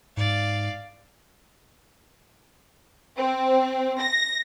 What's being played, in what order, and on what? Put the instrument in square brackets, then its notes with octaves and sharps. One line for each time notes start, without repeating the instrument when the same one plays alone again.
[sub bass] G#2 [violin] D5 F5
[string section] C4
A#6